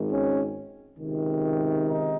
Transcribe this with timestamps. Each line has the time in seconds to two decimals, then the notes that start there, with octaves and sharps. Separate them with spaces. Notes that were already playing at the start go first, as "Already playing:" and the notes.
Already playing: G#1 G#2 D#3
0.10 C#4
0.98 C#2 C3 D#3
1.86 D#4